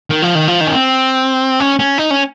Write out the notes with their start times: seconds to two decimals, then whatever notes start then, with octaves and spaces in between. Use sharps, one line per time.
0.10 D#3
0.22 F3
0.35 D#3
0.48 F3
0.61 D#3
0.67 C#4
0.72 C4
1.60 C#4
1.79 C#4
1.98 D#4
2.11 C#4